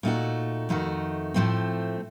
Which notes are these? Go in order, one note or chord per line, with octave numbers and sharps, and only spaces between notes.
A#2 A3 D#4 F#4
F2 D#3 A3 D#4 F#4
A2 F3 A3 C4